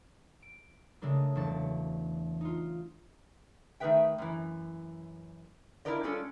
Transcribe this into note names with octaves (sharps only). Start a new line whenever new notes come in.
D7
C#3 G#3 A3 D4 A#4
E1 F#3 D4 C#6 A6
D#4 F4
D#3 A3 G#4 B4 E5 G5
F#2 E3
D4 E4 F4 A#4 D5 D#5
G3 G#3 C#4 D4 F4 A4